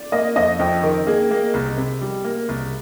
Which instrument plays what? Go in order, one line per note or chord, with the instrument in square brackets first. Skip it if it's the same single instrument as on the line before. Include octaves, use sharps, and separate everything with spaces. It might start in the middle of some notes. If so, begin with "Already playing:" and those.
Already playing: [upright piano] D5
[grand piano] A#3 [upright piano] D#5
[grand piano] F2 [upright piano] D#5
[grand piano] F2 [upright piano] G5
[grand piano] D#3 [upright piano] A#4
[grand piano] A#3 [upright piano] G#4
[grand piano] A#3
C2
C3
G3
A#3
C2